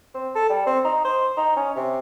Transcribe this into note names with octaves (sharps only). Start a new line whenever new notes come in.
C4
A4
G3
C4
D#4
C5
D#4
C#4
C3